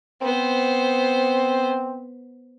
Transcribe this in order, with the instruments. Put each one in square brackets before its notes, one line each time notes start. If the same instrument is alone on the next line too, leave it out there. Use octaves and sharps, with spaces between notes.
[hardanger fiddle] B3 C5 [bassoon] C4